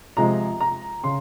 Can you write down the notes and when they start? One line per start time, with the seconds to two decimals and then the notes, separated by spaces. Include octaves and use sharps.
0.17 C3 F3 G#3 A#5
0.60 A#5
1.04 C#3 C6